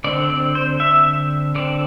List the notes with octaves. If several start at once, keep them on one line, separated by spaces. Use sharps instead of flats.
D3 C4 D5
D5
C5
E5
D3 C4 D5